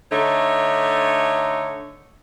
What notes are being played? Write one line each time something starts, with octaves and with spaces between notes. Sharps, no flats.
D3 A3 D#4 C#5